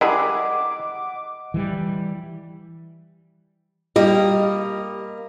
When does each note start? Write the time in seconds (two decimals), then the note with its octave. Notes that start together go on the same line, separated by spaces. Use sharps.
0.01 G3 G#3 E4 G#4 A#4 D#5 F#5 D6
1.54 E3 G3
3.96 G3 A#3 D#5